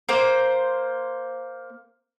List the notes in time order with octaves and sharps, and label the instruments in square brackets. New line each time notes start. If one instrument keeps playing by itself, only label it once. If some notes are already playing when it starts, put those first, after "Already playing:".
[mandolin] A#3 C5